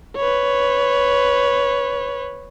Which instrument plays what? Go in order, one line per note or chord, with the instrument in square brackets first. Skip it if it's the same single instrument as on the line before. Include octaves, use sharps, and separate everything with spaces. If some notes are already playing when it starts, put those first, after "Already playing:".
[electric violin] B4 C#5